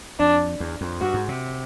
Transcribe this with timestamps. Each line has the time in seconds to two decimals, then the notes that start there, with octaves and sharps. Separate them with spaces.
0.19 F2 D4
0.60 E2
0.81 F2
1.01 G2 F#4
1.14 G#2
1.28 C3